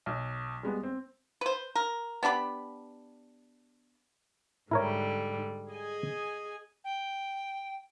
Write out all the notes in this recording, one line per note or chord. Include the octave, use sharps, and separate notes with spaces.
B1
G3 G#3 B3
C4
B4 C5
A#4
B3 D4 G4 B5
G#2 D3 G3 E4 A#4 C#5
G#4 D#5 G#5
G5